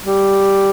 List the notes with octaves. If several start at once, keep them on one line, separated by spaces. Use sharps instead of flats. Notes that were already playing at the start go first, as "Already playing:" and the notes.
G3